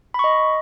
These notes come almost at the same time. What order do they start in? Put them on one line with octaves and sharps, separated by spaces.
B5 C#6 D#5